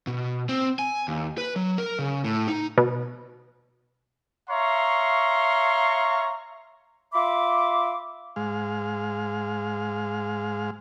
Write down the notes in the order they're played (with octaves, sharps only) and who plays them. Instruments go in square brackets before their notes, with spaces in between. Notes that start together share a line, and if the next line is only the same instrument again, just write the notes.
[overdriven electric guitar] B2
C4
G#5
D#2
B4
F#3
A#4
C#3
A2
D#4
[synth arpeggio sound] B2
[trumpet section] C#5 E5 F5 A#5 C6 C#6
[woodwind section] F4 E5 B5 C6 D6
[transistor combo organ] G#2 G#3 F5